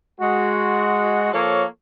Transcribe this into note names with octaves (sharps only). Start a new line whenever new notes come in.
G#3 F#4
F3 A#3 A4 C#5